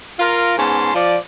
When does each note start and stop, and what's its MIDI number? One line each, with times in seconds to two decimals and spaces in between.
0.19 0.54 65
0.19 0.54 70
0.58 0.94 44
0.58 0.94 59
0.58 0.94 61
0.58 0.94 81
0.58 0.94 84
0.95 1.16 53
0.95 1.16 74